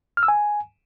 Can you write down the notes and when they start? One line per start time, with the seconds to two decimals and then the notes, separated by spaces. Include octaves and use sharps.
0.17 F6
0.23 E6
0.28 G#5